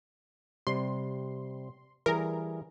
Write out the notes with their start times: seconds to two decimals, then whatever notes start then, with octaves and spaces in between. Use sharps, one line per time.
0.67 C3 G3 C6
2.06 E3 G3 G#4 A#4